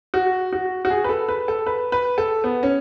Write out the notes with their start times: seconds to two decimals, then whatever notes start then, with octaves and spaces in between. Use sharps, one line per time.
0.14 F#4
0.53 F#4
0.85 F#4
0.90 G#4
1.04 B4
1.09 A4
1.29 B4
1.48 A4
1.67 B4
1.92 B4
2.18 A4
2.44 B3
2.63 C#4